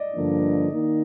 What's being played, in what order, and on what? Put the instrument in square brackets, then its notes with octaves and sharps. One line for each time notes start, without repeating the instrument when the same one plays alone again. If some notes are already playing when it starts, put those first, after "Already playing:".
Already playing: [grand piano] D5 D#5
[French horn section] G2 D3 F3 A#3 D4
D#3 A#3 D#4